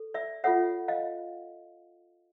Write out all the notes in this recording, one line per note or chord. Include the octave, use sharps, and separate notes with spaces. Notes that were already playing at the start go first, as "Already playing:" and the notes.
Already playing: A4
D5 E5
F4 A4 C#5 E5 F#5
D#5 F5